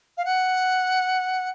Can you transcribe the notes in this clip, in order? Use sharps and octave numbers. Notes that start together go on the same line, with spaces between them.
F5
F#5